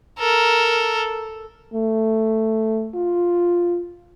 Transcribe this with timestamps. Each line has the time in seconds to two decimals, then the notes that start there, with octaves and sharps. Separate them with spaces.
0.19 A4 A#4
1.74 A3
2.95 F4